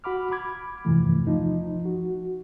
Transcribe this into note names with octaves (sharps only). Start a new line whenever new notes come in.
F#4 F#5 B5 D6 F6
B5 D6 G#6
E2 G2 C3 E3 F3 A3
F3 D#4
F#4